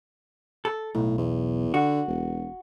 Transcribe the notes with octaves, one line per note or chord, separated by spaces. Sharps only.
A4
B1 A2
E2
D3 F#4
E1